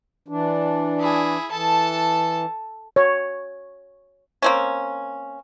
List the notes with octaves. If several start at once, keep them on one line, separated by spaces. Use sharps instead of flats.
E3 D4
E4 G#4
E3 A4 A5
C#5
A#3 C4 C#4